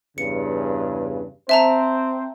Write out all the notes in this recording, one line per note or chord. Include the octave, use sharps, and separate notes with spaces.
E2 G2 C#3 C#7
C4 C5 E5 A5 A#5